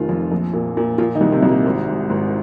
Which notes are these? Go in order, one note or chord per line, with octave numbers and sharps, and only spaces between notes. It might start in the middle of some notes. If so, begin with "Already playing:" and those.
Already playing: F1 D#3 F3 F4
F2
A#1
A#2
A#2
A#2 F3 F4
D#3 D#4
C2
C3 C4
C2
A#2 A#3
G#1
G#2
G#1